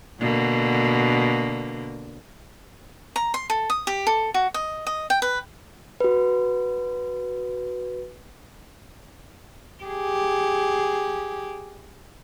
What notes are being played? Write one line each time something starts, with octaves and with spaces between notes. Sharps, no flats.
B2 D3 A#3
A#5
C6
A4
D#6
G4
A4
F#4
D#5
D#5
G5
B4
F#4 B4
G4 G#4